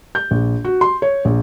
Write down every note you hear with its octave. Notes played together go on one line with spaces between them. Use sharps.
G6
A#1
F#4
C6
C#5
A#1